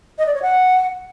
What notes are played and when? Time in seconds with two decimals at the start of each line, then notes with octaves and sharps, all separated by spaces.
0.18 D#5
0.26 D5
0.34 C#5
0.42 F#5